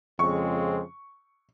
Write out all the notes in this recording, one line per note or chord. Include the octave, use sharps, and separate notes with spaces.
F2 C#3 F3 G#3 C4 C#6